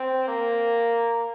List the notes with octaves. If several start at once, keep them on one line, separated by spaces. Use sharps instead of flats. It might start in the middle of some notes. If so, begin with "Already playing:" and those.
Already playing: C4
A#3